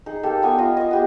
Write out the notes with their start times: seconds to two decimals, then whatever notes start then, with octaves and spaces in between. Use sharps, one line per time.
0.06 D#4 G#4
0.23 A#3 G4 A4
0.42 G3 B3 G#5 D6
0.58 F4 D#5
0.77 G3 D#5
0.91 B3 G4 G#4